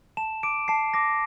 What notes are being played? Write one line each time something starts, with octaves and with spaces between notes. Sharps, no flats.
A5 E7
D6 D7
A5 C7
D6 A#6